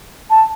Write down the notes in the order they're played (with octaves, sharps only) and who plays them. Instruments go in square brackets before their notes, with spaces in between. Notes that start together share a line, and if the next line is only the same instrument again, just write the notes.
[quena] A5